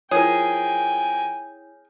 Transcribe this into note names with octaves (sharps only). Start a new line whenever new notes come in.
F3 E4 G#4 A#4 C#5 G5 G#5